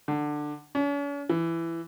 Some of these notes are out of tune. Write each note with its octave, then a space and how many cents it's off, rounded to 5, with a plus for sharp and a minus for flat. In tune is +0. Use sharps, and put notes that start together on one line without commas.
D3 +15
C#4 +45
E3 +15